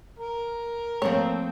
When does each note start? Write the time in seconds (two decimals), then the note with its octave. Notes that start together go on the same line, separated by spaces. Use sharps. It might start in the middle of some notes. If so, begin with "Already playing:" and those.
0.19 A#4
1.02 F3 A3 A#3 C4 C#5